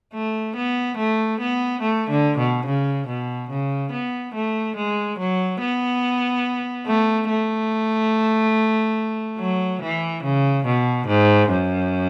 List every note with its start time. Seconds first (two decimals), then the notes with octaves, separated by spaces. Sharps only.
0.14 A3
0.56 B3
0.98 A3
1.40 B3
1.82 A3
2.10 D3
2.38 B2
2.66 C#3
3.08 B2
3.50 C#3
3.92 B3
4.35 A3
4.76 G#3
5.19 F#3
5.61 B3
6.87 A3
7.29 A3
9.39 F#3
9.82 E3
10.23 C#3
10.66 B2
11.07 G#2
11.49 F#2